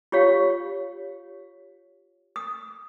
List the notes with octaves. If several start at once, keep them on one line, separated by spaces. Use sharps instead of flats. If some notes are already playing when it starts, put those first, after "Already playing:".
F4 G4 C#5 F5
D#6